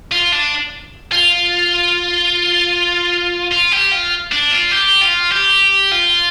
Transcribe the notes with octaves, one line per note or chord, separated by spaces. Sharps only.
F4
D4
F4
F4
G4
F4
D4
F4
G4
F4
G4
F4